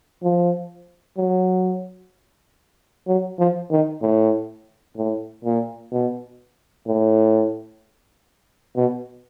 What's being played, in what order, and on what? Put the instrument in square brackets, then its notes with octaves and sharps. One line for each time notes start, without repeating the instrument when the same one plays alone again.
[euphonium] F3
F#3
F#3
F3
D#3
A2
A2
A#2
B2
A2
B2